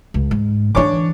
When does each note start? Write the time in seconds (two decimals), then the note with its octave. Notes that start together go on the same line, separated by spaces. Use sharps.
0.14 C#2
0.31 G#2
0.75 D3 E3 D4 C#5 D6